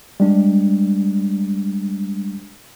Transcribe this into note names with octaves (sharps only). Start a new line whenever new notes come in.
G3 G#3 D4